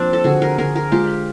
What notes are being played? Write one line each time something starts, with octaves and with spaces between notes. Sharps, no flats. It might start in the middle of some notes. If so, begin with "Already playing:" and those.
Already playing: F3 A#3 C4 D4
A4
D3 F#4 G#4
G#4 A#4
D3 G#4 A#4
G#4 A#4
G#3 F4 G4